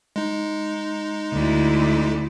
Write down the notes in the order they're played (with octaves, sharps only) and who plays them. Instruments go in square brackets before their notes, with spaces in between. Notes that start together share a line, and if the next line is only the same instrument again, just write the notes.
[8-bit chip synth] G#3 D#4
[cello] D2 E4